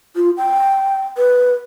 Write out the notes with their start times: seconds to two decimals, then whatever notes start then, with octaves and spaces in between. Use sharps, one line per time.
0.16 F4
0.37 G5
1.17 B4